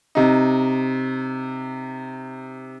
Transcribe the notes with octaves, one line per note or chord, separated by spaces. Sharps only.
C3 D#4